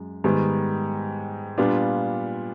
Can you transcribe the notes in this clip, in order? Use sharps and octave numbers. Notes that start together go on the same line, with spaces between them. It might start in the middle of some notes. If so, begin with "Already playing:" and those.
Already playing: F#2 G#3
G#2 D#3 G3 B3
A#2 G3 B3 D4 F4